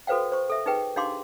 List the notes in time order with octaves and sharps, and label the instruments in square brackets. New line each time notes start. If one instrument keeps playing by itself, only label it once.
[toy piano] F#4 A4 B4 C5 F5 G5
C5 C#6
A4 E5
D#4 G#4 B4 G5
D4 D#4 G4 F5 C6 D6